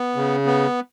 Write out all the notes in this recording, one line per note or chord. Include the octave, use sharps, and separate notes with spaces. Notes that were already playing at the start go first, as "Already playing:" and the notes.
Already playing: B3
C#3
B3